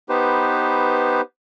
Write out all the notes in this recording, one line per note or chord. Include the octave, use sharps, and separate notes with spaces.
B3 D#4 G4 B4 C5